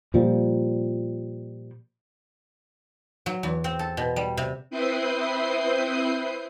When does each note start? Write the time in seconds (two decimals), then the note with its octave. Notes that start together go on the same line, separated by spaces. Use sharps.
0.14 A#2 F3 G3
3.26 F#3
3.43 E2
3.64 C4
3.79 A4
3.97 B2
4.16 G3
4.37 C3
4.70 C4 E4 B4 D#6 G6 C7